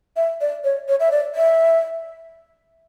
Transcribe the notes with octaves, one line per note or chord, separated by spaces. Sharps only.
E5
D5
C#5
C#5
E5
D5
E5